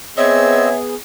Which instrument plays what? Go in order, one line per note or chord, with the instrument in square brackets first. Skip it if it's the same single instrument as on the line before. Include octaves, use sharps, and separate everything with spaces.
[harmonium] B3 G#4 [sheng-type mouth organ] C4 D#5 E6 [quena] C#5 [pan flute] E5